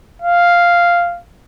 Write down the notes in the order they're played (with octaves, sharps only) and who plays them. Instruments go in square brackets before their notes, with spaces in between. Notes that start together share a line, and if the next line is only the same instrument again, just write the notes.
[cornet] F5